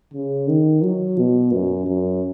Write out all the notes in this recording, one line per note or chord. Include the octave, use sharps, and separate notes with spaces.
C#3
D#3
F#3
B2
F#2
F#2